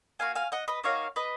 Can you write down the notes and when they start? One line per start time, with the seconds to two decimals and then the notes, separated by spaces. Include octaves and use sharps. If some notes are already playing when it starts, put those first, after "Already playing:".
0.19 A#3 D#4 F#4 F5 G#5
0.35 F5 G#5
0.52 D#5 F#5
0.68 B4 D#5
0.84 A#3 D#4 F#4 C#5 F5
1.16 B4 D#5